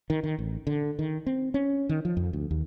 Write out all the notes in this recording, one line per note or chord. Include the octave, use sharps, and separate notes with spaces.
D#3
D#3
A1
D3
D#3
C4
C#4
D#3
F3
F2
D2
D#2